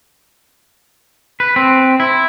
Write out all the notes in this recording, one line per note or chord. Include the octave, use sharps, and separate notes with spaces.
B4
C4
E4